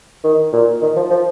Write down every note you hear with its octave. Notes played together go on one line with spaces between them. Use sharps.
D#3
A#2
D#3
F3
F3